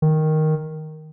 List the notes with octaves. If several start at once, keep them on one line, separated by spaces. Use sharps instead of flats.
D#3